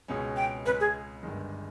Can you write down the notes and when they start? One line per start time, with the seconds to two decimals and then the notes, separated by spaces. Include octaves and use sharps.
0.08 C#2 B2 G#3 C#4
0.37 G5
0.65 C#2 C#3 G#3 B4
0.80 G#4
1.23 G1 G2 D#3 G#3